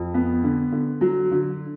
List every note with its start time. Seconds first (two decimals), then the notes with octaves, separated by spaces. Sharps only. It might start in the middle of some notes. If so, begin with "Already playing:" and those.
Already playing: F2
0.14 B3
0.44 D3
0.72 D3
1.01 F#3
1.31 D3